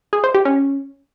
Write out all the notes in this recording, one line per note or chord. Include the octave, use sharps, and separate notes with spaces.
G#4
C5
G4
C#4